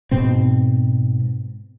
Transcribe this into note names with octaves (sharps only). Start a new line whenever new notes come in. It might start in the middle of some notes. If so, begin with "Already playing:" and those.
G#2 B2 C4